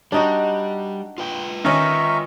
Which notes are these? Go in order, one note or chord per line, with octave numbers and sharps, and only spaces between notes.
G3 D4 D#4 F#4
F4 B4 G5
D#3 C#4 E5 A#5 C#6